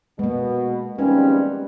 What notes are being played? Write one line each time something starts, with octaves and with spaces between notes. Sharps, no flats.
B2 G#3 A#3
E2 D#3 F3 G3 C4 C#4 B4